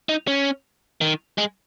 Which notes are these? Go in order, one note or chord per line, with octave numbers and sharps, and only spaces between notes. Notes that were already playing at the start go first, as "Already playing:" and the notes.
D#4
C#4
D#3
G#3